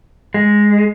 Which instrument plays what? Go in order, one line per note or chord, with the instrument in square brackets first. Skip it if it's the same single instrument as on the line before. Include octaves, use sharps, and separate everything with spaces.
[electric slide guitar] G#3